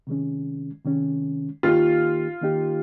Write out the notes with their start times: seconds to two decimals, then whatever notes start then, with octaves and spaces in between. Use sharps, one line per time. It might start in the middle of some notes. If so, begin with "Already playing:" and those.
0.07 C3 D#3 G#3 C#4
0.85 C3 D#3 G#3 C#4
1.63 D#3 A#3 D#4 F4 G4
2.42 D#3 A#3 D#4 G4